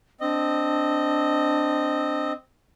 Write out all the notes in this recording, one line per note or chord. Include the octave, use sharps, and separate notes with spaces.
C4 D4 D#5